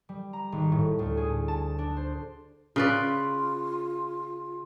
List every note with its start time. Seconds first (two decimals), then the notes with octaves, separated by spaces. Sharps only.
0.09 G3
0.33 A#5
0.52 G#1
0.72 A2
0.99 D2
1.17 G#4
1.48 A5
1.79 D4
1.97 C5
2.76 C#3 F4 B4 D5